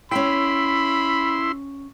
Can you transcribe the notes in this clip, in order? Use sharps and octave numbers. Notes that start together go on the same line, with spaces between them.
C#4 E4 G5 B5 C6